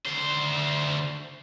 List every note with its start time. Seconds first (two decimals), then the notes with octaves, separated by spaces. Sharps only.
0.06 D2 C5